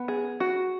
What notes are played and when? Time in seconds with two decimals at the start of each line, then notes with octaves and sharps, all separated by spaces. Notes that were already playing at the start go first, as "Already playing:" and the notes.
Already playing: B3
0.08 G#4
0.40 F#4